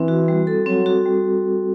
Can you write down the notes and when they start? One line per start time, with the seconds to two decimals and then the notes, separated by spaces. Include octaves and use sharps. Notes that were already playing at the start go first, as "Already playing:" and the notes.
Already playing: E3 C4
0.08 F#4
0.28 G3
0.47 A4
0.66 F#3 C4
0.86 F#4
1.06 G3